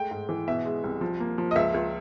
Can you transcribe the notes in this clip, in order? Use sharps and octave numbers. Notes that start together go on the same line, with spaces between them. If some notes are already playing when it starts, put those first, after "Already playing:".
Already playing: G#3 A3 G5
G#2
E3
B2 E5
G#3
C2
F3
A#3
F3
D#5
C#2 E5
C#2